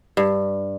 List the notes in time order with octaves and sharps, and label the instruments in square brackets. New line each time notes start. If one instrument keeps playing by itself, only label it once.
[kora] G2